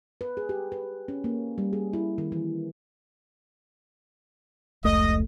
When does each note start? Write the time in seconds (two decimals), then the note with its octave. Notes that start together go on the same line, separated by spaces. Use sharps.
0.21 B4
0.37 G#4
0.49 G4
0.72 B4
1.08 C#4
1.24 A#3
1.58 G3
1.73 G#4
1.93 E4
2.18 D#3
2.32 E3
4.84 F1 C#2 A3 D#5